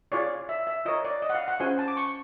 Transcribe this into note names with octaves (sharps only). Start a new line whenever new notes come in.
F4 G#4 C#5 D5
E5
E5
F4 A#4 C#5 D#5
D5
D#5
F#5
F5
F#5
C#4 F4 G#4 C5 G#5
A5
D6
C#6